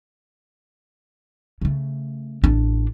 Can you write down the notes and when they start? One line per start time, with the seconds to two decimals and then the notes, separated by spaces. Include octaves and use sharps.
1.61 C#3 A3
2.44 A1 D4